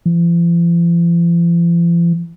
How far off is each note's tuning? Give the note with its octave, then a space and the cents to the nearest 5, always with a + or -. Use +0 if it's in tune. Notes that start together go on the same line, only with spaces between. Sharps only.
F3 -45